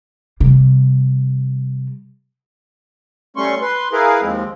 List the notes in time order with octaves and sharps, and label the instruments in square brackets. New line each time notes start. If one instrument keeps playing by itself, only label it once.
[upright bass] C3 G3
[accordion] G3 A3 C#4 C6 C#6
B4 C6
E4 G#4 A#4 B4 F5
D#2 F3 G#3 C4